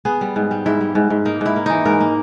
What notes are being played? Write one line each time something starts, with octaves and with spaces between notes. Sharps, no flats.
B3 G#4
G3
G#2
G3
G#2 E4
G3
G#2
G#2
A#3 D#4
G#2 E4
A#3
E3 D#4
G#2 A#4
A#3